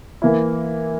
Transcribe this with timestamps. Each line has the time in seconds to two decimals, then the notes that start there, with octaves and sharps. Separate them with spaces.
0.22 E3 A#3 E4